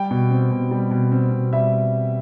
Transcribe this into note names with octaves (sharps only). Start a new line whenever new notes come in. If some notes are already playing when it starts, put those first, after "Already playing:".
Already playing: G3 G5
B2
C4
B2
G3
B2
C4
B2
G3 E5